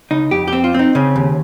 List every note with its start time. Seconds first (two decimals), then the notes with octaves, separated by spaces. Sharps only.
0.11 C#2 D#4
0.31 F2 G4
0.48 C4 G4
0.64 F4
0.74 C4 D#4
0.95 C#3 C#4
1.16 D#2